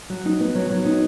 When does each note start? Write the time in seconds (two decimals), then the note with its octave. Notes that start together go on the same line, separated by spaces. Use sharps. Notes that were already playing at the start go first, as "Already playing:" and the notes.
0.10 F#3
0.25 D#4
0.40 B3
0.55 F#3
0.70 F#3
0.85 D#4